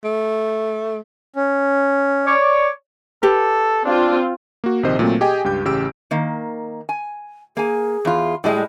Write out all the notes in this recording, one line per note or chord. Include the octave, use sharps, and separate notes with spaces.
A3
C#4
C#5 D5
G4 A4 B4
C4 D4 F4
A#3 F#4
A#1 C3 D#3 C5 D#5
A#2 F#3 A3 C4
G4 G#4 D#5 G5 G#5
C#2 G2 G4 G6
A1 C#3 G4 E6 D7
D#3 A#3
G#5
A#3 G#4 G#5
E2 F4
A2 G3 G#3 D#5